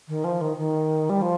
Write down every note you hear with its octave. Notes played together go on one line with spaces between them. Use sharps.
D#3
F3
D#3
D#3
G3
F3